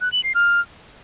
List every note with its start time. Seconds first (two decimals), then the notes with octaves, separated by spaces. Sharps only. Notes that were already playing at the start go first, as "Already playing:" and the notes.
0.01 F#6
0.12 F#7
0.24 C7
0.35 F6